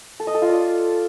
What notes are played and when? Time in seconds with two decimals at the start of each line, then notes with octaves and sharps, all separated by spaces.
0.20 A4
0.27 D#5
0.35 A4
0.42 F4
0.49 D5